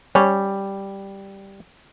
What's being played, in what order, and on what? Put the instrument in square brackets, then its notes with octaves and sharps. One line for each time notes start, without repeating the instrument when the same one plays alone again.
[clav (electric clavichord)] G3 [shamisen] C#4